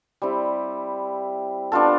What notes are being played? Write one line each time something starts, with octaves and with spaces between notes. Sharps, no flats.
G3 C4 E4
B3 D4 F4 A4